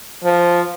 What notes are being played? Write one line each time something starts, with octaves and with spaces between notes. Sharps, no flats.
F3